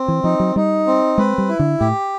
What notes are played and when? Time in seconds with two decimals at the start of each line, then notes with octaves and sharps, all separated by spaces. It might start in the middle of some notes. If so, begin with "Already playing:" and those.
Already playing: C4
0.08 E3
0.24 F3 D#4
0.40 F#3
0.56 G3 D#4
0.87 C4
1.18 G#3 B4
1.38 G3
1.49 E4
1.59 D3
1.80 A2 G4